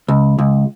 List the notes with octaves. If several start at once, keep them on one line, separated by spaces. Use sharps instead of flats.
C#2
C#2